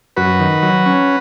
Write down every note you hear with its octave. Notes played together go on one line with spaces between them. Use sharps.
F#2 F#4 B4
D#3
F#3
C#4